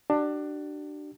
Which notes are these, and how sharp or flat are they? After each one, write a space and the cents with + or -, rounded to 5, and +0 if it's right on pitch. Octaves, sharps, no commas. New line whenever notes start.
D4 +20 G4 -45